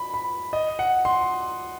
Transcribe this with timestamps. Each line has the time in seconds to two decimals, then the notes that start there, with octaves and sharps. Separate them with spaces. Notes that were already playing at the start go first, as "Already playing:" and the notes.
Already playing: B5
0.14 B5
0.53 D#5
0.79 F#5
1.05 C6